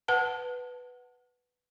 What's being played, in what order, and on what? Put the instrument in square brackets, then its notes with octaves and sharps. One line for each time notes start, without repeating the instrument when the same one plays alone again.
[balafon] B4 F#5 A5